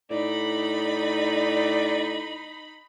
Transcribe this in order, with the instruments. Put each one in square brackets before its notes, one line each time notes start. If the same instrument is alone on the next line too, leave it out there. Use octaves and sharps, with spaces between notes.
[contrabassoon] A2 [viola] D#4 B5 [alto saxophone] D5